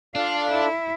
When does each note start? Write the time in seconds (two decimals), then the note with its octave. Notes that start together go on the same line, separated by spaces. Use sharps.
0.16 D4 F4 A4 D5 F5
0.50 E4